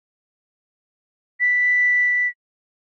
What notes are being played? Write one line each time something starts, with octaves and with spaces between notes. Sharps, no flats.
B6